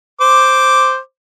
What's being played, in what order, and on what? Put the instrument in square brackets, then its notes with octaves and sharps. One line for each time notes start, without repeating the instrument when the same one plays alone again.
[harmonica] C5 D6